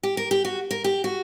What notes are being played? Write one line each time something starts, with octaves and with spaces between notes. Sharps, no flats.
G4
A#4
G4
F#4
A#4
G4
F#4